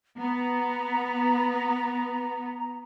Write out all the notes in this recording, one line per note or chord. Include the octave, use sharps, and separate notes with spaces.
B3 A#5